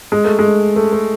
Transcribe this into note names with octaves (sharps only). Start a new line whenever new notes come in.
G#3
A3
G#3
A3
A3